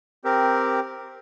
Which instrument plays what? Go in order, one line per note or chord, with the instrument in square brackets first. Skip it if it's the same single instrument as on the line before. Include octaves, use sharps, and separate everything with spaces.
[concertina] C4 G4 A#4